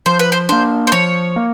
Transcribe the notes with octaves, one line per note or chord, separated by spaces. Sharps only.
F3 C5
B4
C5
A#3 D4 C5
C5
F3 C#5
A#3